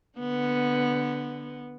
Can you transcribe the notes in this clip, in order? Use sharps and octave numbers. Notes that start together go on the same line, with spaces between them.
D3 B3